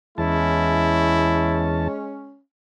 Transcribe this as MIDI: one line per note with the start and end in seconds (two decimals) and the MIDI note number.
0.18 1.88 40
0.18 2.38 56
0.18 2.38 61
0.18 1.73 64
0.18 1.88 81